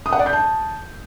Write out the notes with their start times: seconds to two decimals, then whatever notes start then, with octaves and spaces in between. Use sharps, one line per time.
0.06 D#6
0.13 F#5
0.19 D5
0.26 G6
0.33 A5